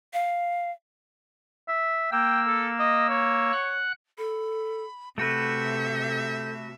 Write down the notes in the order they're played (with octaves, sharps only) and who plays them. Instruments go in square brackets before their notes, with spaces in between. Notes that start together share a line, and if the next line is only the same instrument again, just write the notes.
[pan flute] F5
[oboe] E5
[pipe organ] A#3 E6 [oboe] G5
[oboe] A4
D#5
C#5
[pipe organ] F#5 F#6
[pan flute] A4 [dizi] B5
[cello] C3 E5 [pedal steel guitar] A3 F#4 B4 [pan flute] A4 [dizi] G6